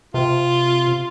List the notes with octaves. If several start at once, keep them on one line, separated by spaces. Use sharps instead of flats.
C3 F4